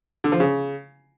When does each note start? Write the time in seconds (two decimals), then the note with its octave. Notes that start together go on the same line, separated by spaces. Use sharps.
0.24 D3
0.32 F3
0.40 C#3